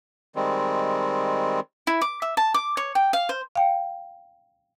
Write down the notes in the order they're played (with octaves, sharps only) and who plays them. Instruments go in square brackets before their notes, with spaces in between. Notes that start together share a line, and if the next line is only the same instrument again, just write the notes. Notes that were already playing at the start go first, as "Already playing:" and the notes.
[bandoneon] D#3 G3 G#3 C4
[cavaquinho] E4
D6
E5
A5
D6
C#5
G5
F5
C5
[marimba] F5 G5